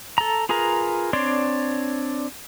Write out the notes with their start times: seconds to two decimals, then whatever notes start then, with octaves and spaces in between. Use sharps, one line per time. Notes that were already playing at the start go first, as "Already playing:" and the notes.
0.18 A4 A#5
0.49 F4 G#4 A#4 B4 A#5
1.13 C4 D4 C#5 D5 C6